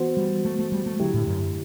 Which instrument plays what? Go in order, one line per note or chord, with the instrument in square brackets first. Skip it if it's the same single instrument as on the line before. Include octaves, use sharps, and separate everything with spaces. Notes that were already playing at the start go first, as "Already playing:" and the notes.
Already playing: [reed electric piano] E3 B3 F#4 C5
[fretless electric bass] G3
A3
A3
G3
A3
[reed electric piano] D2 D3 A3 E4 G4 [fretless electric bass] F#3
[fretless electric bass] A2
F#2